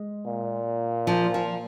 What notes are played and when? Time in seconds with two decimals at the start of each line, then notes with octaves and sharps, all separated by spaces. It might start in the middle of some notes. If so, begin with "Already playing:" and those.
Already playing: G#3
0.26 A#2
1.07 F3
1.34 F3